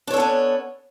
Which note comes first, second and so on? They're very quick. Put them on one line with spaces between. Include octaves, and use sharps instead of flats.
D4 C#5 A4 B3 C#4